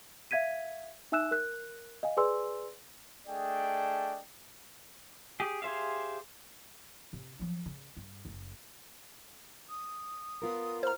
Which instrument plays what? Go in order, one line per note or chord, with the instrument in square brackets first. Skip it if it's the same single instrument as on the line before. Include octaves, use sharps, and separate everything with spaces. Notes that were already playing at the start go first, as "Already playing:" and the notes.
[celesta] E5 F5 G#6 B6 D#7
D#4 E5 G#5 E6 F#6 E7
A#4 F#6
D#5 F5 G#5
G#4 B4 D5 G#5 C6 E6
[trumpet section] A3 D4 G#4 D5 D#5 G5
[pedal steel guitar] G4 G#4
G4 G#4 C5 E5 F5
[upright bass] C3
F3 F#3
C#3
G2
F#1 A3
[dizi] D#6
[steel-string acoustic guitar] B3 F4 A#4
[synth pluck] C5 A#5 [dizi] F6